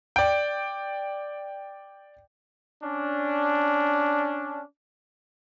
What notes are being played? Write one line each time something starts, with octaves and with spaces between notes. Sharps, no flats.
D5 G5
C#4 D4